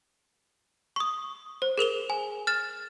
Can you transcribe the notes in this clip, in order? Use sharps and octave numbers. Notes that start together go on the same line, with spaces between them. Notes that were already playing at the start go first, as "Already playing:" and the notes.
C#6 D#6
C5
G#4 A#4 F7 G7
G#5
F6 A6 E7